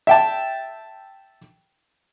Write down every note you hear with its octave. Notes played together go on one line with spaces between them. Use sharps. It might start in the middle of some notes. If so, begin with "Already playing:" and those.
E5 G5 A5